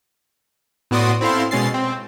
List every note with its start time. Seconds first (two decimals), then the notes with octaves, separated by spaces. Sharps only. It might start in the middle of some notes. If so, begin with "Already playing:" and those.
0.91 A2 B3 F#4 D5 C6 D#6
1.21 C4 E4 A4 F5 C6
1.51 B2 G#3 C#4 A6 C7
1.74 C4